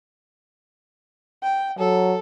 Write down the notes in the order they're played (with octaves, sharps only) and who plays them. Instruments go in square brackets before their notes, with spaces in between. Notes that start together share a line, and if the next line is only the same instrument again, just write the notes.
[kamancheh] G5
[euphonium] F#3 [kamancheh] A4